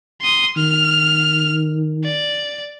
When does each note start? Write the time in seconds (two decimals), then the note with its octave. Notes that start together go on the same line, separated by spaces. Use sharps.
0.22 C6 D#6
0.57 D#3 F6
2.04 D5